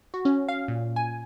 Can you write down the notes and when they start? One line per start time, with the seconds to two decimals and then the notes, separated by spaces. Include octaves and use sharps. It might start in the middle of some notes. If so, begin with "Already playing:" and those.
0.14 F#4
0.25 C#4
0.49 F5
0.68 A#2
0.96 G#5